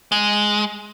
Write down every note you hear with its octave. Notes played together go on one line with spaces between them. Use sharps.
G#3